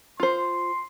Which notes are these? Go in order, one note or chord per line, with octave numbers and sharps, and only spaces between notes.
F4 C5 C6